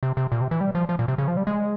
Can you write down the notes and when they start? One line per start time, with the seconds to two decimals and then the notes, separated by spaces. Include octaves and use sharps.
0.03 C3
0.17 C3
0.32 A#2
0.41 C3
0.51 E3
0.61 G3
0.75 F3
0.89 F3
0.99 A#2
1.08 C3
1.18 C#3
1.28 F3
1.37 G3
1.47 G#3